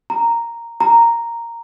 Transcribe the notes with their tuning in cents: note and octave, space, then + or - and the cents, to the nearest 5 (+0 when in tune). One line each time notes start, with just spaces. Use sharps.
A#5 -5
A#5 -5